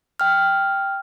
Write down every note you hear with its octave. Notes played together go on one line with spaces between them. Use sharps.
G5 F6